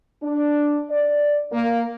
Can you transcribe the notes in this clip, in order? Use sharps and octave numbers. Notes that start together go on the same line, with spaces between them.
D4
D5
A#3